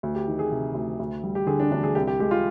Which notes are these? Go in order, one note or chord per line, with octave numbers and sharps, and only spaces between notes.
D2
G4
D#3
G#4
C3
D2
D2
G3
G4
D3 G#4
D4
D2 D4
G#4
C2 G4
G4
G#3 G4
F4